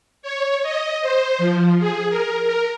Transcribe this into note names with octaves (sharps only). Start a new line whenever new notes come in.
C#5
D#5
C5
F3
G#4
A#4
A#4